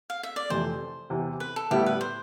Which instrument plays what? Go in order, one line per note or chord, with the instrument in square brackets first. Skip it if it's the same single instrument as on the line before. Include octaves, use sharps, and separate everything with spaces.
[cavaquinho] F5
E5
D5
[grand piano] F2 C3 E3 A3 [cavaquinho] C5
[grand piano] E2 C3 E3
[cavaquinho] B4
A4
[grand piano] A2 G3 B3 E4 [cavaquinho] G4
[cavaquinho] B4
C5